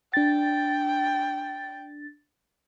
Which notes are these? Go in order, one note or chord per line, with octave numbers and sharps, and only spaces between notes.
D4 G5 A6